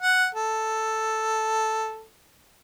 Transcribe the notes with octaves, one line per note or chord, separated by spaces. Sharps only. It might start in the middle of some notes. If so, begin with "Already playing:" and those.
F#5
A4